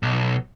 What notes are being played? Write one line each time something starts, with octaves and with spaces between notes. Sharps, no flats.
B1